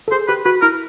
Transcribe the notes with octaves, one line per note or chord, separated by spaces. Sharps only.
A4
G#4 C5
G4 B4
F#4 B4
E4 A#4